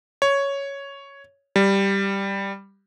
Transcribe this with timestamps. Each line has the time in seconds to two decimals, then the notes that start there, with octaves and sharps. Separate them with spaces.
0.22 C#5
1.56 G3